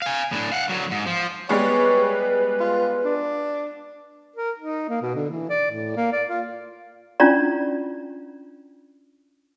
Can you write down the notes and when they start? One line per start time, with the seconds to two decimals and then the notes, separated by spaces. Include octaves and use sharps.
0.02 F5 G#5
0.32 A2 D4
0.52 F5 F#5
0.69 D3 F#3
0.91 G#2
1.06 F3
1.49 G3 G#3 B3 B4 C#5
2.60 F4
3.05 D4
4.36 A#4
4.58 D#4
4.89 A#3
5.02 B2
5.15 D3
5.30 E3
5.50 D5
5.71 A2
5.96 A#3
6.12 D5
6.29 F4
7.20 C#4 D4 E4 F4 D5 A#5